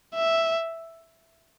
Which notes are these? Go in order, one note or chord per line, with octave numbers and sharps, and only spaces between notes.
E5